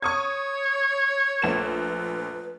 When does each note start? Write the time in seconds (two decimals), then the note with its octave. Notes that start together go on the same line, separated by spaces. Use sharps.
0.02 C#5 C#6 D#6 G#6
1.42 A#1 A3 B4 E7